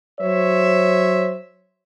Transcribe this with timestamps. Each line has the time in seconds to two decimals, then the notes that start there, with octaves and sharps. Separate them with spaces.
0.20 F#3 C5 C#5 E5